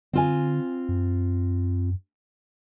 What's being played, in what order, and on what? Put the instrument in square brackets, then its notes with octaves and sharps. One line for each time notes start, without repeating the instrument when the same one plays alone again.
[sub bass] D3 [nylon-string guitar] C4 F4 G#5
[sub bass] F#2